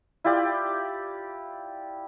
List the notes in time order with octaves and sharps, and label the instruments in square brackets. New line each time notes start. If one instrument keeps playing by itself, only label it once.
[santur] E4 F4 G4 D5